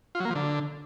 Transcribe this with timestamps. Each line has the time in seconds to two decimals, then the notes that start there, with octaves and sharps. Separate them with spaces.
0.15 F4
0.20 F#3
0.25 A#3
0.30 F3
0.35 D3